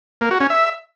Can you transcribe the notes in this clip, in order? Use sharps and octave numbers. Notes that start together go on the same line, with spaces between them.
A#3
F#4
C#4
E5